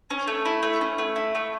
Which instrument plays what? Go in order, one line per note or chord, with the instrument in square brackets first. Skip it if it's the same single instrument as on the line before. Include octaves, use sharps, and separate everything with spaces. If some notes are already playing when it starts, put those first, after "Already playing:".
[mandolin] C#4
A3
E4
A3
C#4
A3
E4
A3